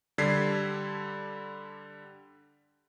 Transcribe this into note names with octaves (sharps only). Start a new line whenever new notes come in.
D3 G3 A4 G#6 B6 C7